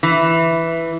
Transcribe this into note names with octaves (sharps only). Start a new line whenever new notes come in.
E3